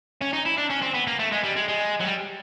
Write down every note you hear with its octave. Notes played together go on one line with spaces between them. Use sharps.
C#4
D#4
E4
D4
C#4
C4
B3
A#3
A3
G#3
G3
G#3
G#3
F#3
G3